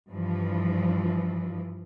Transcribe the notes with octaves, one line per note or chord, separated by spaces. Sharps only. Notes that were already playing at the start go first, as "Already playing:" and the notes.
G2 E3 F3